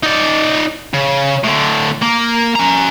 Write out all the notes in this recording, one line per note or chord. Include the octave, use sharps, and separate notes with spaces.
D#4 D5
C#3
A2 D3
A#3
C#4 A#5